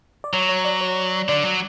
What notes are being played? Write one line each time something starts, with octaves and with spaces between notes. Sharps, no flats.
D5
F#3 C#5
C#5
D5
C#5
D3 D5
F#3